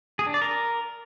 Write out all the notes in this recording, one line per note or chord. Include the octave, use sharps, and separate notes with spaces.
G#4
D4
D5
A#4